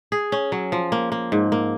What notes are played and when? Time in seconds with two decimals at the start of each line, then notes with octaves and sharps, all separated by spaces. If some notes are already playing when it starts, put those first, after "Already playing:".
0.12 G#4
0.32 C#4
0.52 F#3
0.72 F3
0.92 A#3
1.12 A#3
1.32 G#2
1.52 A#3